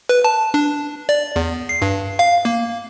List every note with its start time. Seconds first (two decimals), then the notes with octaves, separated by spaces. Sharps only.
0.09 B4
0.24 A5
0.54 D4
1.09 D5
1.36 E2
1.69 C7
1.82 G2
2.19 F5
2.45 A#3